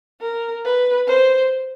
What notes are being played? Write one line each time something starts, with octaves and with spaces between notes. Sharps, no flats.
A#4
B4
C5